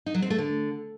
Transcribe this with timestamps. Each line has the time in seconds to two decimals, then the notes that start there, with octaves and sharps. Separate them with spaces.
0.06 D#4
0.14 F#3
0.22 C4
0.30 A3
0.38 D3